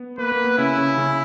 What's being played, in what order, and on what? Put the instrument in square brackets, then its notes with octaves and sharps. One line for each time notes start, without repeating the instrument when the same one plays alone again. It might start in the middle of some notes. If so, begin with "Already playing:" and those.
Already playing: [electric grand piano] B3
[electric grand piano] A#3 [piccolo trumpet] B4
[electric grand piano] A#3
B3
[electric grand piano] C#3 C#4 [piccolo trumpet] E4
[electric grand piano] C#3 C#4
C#3 C#4